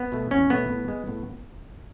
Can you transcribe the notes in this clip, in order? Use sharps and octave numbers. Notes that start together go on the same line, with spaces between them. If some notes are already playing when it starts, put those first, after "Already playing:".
Already playing: B3
B2 A3
E2 C#4
B2 A3 B3
A2
G#3
A2